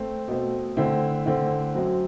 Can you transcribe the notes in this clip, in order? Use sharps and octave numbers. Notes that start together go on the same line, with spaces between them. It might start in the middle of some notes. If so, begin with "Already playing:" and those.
Already playing: A3 C4
B2 A3 C4
D3 A3 C4 E4
D3 A3 C4 E4
F#2 F#3 C4